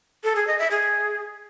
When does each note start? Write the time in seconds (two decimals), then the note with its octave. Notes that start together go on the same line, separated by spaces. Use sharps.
0.24 A4
0.36 G#4
0.47 D#5
0.59 E5
0.71 G#4